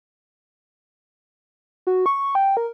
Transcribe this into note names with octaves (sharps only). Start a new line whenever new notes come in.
F#4
C#6
G5
A#4